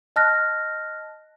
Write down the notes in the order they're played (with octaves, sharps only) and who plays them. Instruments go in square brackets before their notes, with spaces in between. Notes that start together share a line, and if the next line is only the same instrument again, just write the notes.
[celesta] D#5 A5 F6 F#6 A#6